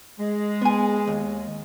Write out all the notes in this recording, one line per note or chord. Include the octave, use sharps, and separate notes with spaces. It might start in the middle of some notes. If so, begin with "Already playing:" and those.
G#3
B3 G#5
D#2